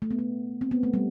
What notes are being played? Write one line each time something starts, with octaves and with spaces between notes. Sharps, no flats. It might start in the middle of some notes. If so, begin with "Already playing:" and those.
A3
B3
A3
C4
B3
A3
G3